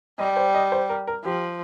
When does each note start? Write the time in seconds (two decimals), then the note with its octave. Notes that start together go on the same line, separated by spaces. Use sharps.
0.19 G3 D#5
0.36 C5
0.54 D#5
0.72 C5
0.89 A#4
1.07 A#4
1.25 F3 G4